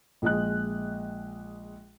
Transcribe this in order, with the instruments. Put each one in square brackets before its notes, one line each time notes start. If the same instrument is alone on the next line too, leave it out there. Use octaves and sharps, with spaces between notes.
[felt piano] A#1 G#3 D#5 F#6